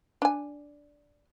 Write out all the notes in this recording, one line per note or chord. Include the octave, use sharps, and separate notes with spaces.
D4 G#5